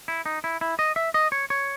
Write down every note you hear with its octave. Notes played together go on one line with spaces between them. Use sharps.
E4
D#4
E4
E4
D#5
E5
D#5
C#5
C#5